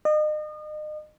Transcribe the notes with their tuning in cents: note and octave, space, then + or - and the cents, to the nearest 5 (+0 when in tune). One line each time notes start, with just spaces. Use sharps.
D#5 -35